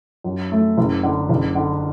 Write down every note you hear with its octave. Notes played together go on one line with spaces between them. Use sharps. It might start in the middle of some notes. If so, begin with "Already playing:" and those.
F#2
A3
F#1
D3
F#1
D3